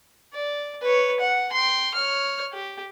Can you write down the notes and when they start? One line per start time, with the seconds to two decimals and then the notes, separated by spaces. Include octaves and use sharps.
0.33 D5
0.82 B4 C#5
1.20 F#5
1.52 G5 C6
1.95 C#5 F6
2.53 G4